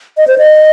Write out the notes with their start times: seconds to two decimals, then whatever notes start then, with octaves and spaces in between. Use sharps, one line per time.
0.17 D#5
0.28 C5
0.38 D#5